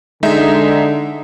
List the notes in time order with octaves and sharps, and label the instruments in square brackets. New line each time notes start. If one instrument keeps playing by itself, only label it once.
[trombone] D3 [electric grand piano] G#3 D#4 E5